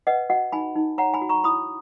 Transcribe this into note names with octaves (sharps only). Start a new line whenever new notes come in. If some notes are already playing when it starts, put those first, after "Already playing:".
B4 D#5 F#5
F#4 D#5 F#5
D#4 G#5 B5
D#4
C#5 F#5 A#5
G#5 B5
F#4
A#5 C#6
E4 B5 D#6